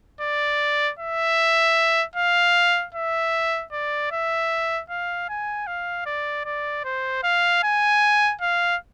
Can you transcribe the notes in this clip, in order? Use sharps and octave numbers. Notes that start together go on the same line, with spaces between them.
D5
E5
F5
E5
D5
E5
F5
G#5
F5
D5
D5
C5
F5
G#5
F5